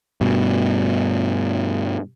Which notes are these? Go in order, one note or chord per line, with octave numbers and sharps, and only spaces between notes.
G2 B2